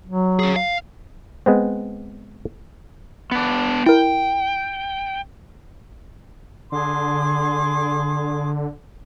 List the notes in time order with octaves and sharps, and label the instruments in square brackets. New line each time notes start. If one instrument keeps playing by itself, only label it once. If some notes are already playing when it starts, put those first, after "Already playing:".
[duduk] F#3
[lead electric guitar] C#4 G#4
F5
[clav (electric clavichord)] G#3 B3 C4
[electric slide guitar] B3 D4
[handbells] E4 A#4 [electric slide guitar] G5
[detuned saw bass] D3 [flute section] G#4 C6 D6